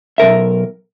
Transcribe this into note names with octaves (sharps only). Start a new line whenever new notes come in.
B1 G#2 A#4 E5